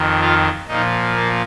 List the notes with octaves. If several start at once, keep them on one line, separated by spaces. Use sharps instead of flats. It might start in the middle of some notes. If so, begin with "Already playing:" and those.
Already playing: F2 D#3
F4
A#2 F3 D#4
A#3